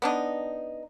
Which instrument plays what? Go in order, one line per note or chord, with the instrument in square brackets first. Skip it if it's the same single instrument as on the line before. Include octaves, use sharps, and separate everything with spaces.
[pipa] B3 D4 D#4